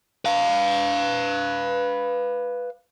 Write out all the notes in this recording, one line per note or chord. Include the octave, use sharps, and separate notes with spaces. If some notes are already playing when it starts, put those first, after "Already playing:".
B4 F5